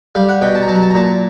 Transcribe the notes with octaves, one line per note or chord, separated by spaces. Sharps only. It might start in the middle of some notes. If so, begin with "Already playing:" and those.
G3 F5
F#5
B2 G5
A5
A#5
F#3 A5
A#5
A5
A#5
A#2 A5